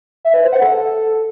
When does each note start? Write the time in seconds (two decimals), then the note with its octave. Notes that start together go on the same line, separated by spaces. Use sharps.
0.25 E5
0.34 B4
0.43 C5
0.52 F#5
0.62 A4